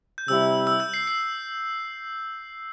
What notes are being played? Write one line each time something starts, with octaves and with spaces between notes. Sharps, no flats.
G6
C3 G3 E4 E6
E6
G6
C7
C7